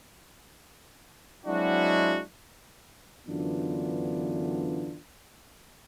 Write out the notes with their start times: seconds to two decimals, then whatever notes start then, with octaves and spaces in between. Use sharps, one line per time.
1.46 F#3 G#3 C4 D4 E4 F#4
3.27 F#2 D3 E3 B3 D4 F4